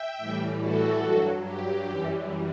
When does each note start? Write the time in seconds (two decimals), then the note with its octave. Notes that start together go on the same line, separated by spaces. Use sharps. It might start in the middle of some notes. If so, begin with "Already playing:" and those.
Already playing: E5 G5
0.18 A2 E3 G3
0.60 F#4 A4
1.02 G2 F#3
1.44 G4
1.86 F#2 E3 G3